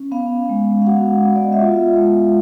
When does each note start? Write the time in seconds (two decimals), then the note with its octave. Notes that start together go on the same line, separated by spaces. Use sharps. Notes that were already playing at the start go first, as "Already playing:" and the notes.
Already playing: C#4
0.12 B3 F5
0.49 G#3
0.82 F5
0.87 F#4 F#5
1.24 B3
1.36 D5
1.43 D#5
1.52 E5
1.60 F4 F5
1.97 G#3